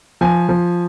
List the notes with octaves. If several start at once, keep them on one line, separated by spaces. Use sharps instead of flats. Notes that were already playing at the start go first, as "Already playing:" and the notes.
F3 G#5
F3